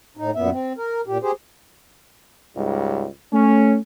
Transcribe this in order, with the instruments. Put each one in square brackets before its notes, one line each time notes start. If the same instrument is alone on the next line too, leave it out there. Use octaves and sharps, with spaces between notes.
[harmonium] A2 D#4
F#2 A#2 B3 E5
C4
A#4
A#2 G4
G4 G#4 C5
[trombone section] C#2 G#2 G3
[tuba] A3 [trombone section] C#4